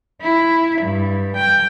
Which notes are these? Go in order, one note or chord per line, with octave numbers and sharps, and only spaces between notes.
E4
G2
G5